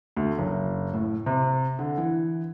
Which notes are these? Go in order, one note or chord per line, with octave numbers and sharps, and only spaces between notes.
D2
F#1
A2
C3
D3
E3